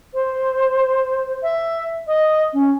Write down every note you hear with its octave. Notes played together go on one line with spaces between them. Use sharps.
C5
E5
D#5
C#4